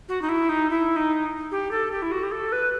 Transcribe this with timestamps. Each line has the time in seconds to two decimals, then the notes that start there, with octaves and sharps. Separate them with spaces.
0.09 F#4
0.22 D#4
0.29 E4
0.49 D#4
0.70 E4
0.96 D#4
1.51 G4
1.71 A4
1.91 G4
2.02 E4
2.12 F#4
2.23 G4
2.32 A4
2.52 B4